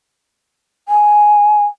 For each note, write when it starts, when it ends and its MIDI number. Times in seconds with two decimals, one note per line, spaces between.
0.89 1.66 80